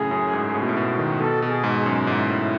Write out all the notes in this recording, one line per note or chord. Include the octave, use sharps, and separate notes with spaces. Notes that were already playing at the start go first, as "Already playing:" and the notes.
Already playing: F#2 A2 C#3 G#4
F#2
G#2
A2
B2
A2
B2
D#3
B2 A4
B2
G#4
G#2
G#4
F#2
G#2 E4
A2